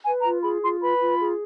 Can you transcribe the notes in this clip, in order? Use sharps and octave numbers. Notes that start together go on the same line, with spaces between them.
B4 G#5
F4 A#5
G#4 B5
F4 C6
B4 B5
F4
G#4